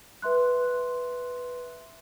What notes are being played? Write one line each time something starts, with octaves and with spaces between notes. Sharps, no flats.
B4 E5 C6 F#6